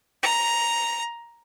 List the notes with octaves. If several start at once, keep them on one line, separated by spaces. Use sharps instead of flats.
A#5